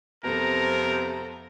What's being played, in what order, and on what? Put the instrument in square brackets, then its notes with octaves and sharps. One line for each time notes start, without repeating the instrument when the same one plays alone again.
[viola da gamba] F2 B3 [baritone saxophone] C3 [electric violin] A4 A#5 [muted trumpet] A#4